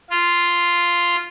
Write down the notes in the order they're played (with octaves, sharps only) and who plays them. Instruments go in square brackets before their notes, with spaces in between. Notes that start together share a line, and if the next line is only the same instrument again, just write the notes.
[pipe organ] F4